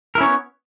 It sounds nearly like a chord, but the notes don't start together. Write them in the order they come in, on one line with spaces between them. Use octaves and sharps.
A#4 E4 C#4 C#5 B3